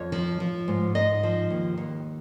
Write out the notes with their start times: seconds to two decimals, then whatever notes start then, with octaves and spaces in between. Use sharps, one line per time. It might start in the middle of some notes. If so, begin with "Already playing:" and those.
Already playing: F2 C#5
0.12 F3
0.40 F3
0.68 G#2
0.95 G#2 D#5
1.23 F3
1.50 D#2
1.78 D#2